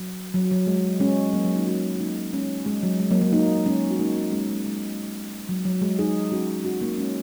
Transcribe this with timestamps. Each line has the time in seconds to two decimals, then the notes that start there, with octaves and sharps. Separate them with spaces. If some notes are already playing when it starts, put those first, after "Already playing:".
Already playing: F#3
0.34 F#3
0.51 F#3
0.67 G#3
1.00 G#3 C#4
1.33 F#3 A#3
1.45 F#3
1.56 A#3 D#4
1.67 C#4 F#4
1.94 F#4
2.00 A#3 D#4
2.33 G#3 C#4
2.66 G#3
2.83 F#3
3.00 G#3
3.11 F#3 A#3
3.21 F#3 A#3
3.32 A#3 D#4
3.66 G#3 C#4
3.91 F#4
3.99 A#3 D#4
4.16 C#4 F#4
4.32 G#3 C#4
4.49 G#3
4.66 G#3
5.49 F#3
5.65 F#3
5.82 G#3
5.99 D#4 G#4
6.32 C#4 F#4
6.65 C#4 F#4
6.81 A#3 D#4
6.98 G#3 C#4